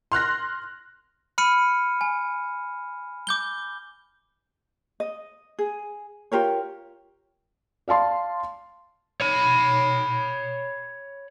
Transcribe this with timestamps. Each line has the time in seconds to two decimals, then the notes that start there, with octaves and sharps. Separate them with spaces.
0.12 C6 F6 F#6 A#6
1.38 B5 F6 C#7 D#7
2.01 G#5
3.27 D6 G6 G7
5.00 D#5
5.59 G#4
6.32 F4 G4 A#4 C#5
7.88 D5 F5 A5 C6
9.21 C#5 B5